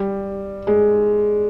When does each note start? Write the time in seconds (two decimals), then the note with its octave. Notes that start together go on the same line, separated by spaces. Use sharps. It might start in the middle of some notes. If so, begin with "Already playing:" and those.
Already playing: G3
0.67 G#3